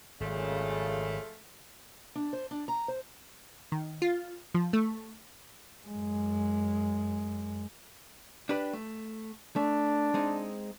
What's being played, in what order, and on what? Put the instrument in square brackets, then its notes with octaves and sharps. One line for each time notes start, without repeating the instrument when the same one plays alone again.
[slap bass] G#1 [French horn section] F#2 A#2 C#3 [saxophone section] F3 G#3 A3
[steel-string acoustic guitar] D4
C5
D4
A#5
C5
[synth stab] D#3
F4
F3
A3
[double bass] F#2 G#3
[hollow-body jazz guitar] D4 G4 B4
A3
[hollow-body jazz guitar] A3 [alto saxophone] D4
[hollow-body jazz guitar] G#3 C4 D#4